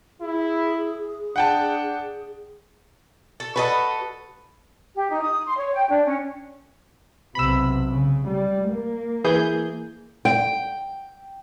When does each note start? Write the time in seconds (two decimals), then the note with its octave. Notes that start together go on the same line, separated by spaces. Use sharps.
0.21 E4 G#4
1.36 D4 F#5 G5 A5
3.40 A4
3.56 F#4 A4 B4 D#5
4.95 G4
5.10 D#4
5.22 D#6
5.45 C6
5.57 C#5
5.74 G5
5.89 D4
6.06 C#4
7.35 B1 C3 B5 E6
7.89 C#3
8.27 G3
8.70 A#3
9.24 E3 G#4 G6
10.25 G5